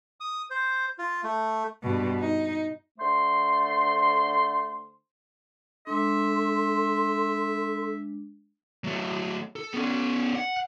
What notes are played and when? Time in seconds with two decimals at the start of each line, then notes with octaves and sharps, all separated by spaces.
0.20 D#6
0.50 C5
0.99 F4
1.24 A3
1.83 G2 B2
2.20 D#4
2.98 D3 A3 C5 C6
5.87 G#3 D4 A4 E5 C6
8.84 F#3 A3
9.56 A4
9.74 B3 C#4
10.36 F#5